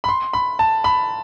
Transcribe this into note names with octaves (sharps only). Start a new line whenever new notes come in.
B5
C6
B5
A5
B5